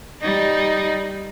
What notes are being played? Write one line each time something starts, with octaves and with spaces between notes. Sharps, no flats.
G3 D#4